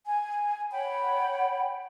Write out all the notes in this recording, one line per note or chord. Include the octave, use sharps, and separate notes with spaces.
G#5
C#5 F#5 G5 B5